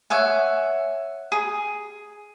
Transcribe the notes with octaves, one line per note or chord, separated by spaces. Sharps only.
C#5 E5 F#5 G#5
G#4